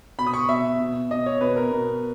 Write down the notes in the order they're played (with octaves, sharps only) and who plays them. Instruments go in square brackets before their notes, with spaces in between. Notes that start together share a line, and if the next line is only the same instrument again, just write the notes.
[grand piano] B2 B5
D#6
C#6
B2 E5
B2
B2 D#5
C#5
B2 B4
A#4
B2